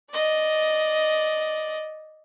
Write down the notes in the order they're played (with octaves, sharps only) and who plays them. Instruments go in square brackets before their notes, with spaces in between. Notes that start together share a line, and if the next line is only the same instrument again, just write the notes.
[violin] D5 D#5